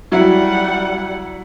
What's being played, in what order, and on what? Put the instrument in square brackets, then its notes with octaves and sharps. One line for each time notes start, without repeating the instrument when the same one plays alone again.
[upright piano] F#3 E4 [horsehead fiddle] G3 F#5